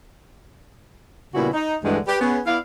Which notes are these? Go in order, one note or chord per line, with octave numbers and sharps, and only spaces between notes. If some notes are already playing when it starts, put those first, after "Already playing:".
A#2 C#3 G3 B3 E4 F#4
D#4
D2 G2 D3 E3 G#3
G4 B4
B3 C#4 G#4
B3 E4 D5 F5